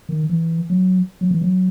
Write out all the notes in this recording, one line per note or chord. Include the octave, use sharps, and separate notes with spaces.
D#3
E3
F#3
F#3
E3
F#3